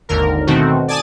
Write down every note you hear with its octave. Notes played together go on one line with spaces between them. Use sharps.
G#1 D#2 D3 A#4
B2 D#3 A3 C4 F#4
D5 G#5 A5 D#6 A6